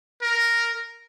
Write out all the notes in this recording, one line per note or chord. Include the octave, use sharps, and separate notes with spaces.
A#4